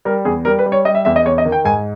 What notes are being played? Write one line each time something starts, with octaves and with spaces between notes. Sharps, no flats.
G3 A#4
E2 G#4
G3 A#4
B4
G3
C#5
G3 D#5
E5
E2 E5
D#5
E2 C#5
D#5
D#3
G5
G#2 G#5